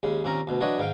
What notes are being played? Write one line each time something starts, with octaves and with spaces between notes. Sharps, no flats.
D#2 C#3 G#3
D#2 A#2 C4 C#4 A#5 C#6
D2 B2
E3 F#3 D4 C#5 D#5 F#5
G#2 D#3 F5 G5